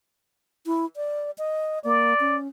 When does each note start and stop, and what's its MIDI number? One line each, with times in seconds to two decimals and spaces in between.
0.66 0.85 64
0.96 1.31 74
1.38 1.79 75
1.84 2.14 58
1.84 2.37 74
2.20 2.48 61